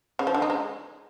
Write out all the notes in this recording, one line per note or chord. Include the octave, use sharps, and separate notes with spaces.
C#3
F3
D3
D#4
G#3